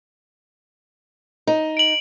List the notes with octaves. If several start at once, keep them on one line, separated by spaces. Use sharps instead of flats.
D#4
D7 F#7